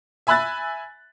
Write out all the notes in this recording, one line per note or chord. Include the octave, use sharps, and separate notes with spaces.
E5 G#5 B5 E6 F#6 A6